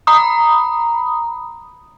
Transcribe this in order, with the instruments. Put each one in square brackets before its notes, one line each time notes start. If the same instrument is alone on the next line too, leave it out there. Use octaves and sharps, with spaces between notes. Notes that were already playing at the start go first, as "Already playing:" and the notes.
[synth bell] A#5 B5 D#6